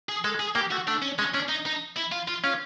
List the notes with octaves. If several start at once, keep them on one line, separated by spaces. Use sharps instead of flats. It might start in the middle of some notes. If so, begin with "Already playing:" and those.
G#4
G#3 A4
G#4
A#3 G4
A3 F#4
A3 D4
C#4
G#3 C#4
C#4 D4
D#4
D#4
E4
F4
F4
C#4 F4